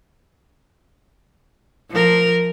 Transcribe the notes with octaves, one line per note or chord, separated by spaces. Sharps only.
F3 A#4